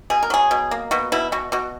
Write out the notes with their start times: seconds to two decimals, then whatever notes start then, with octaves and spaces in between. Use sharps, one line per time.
0.10 B2 G#4
0.23 A#4
0.30 F#3 G#4
0.51 B2
0.71 A#3
0.91 B2 F#4
1.12 B2 E4
1.32 B2 F#4
1.52 B2 F#4